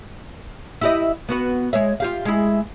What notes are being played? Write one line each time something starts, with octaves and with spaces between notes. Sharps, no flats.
E4 G4 D#5
B3 F#4 B4
G#3 C#5 E5
F4 G4 F5
G#3 E4